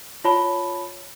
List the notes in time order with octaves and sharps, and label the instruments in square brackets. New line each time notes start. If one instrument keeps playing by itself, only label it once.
[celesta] F4 C#5 A5 B5 G7